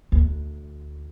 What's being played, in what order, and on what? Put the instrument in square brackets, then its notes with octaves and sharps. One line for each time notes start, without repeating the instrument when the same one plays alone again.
[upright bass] D2